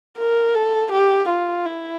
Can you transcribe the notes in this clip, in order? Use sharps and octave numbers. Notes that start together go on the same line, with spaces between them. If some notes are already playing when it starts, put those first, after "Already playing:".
A#4
A4
G4
F4
E4